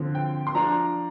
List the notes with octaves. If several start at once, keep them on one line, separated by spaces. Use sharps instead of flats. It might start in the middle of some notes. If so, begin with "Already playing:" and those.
Already playing: D3 F3 C4
G5
C6
F3 D4 A#5